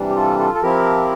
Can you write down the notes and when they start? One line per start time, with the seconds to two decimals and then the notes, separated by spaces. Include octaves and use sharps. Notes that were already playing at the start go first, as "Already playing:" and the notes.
Already playing: C3 E3 G3 D4
0.09 G4
0.16 F4 A4
0.39 F4 A4
0.55 A4
0.62 F3 C4 E4 G4 A#4